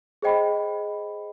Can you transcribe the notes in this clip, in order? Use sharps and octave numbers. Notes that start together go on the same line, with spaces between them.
G#4 C5 D#5 G5 B5